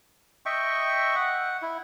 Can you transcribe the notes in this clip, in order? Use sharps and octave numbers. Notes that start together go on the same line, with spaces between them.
D#5 E5 G5 C#6
F#5
E4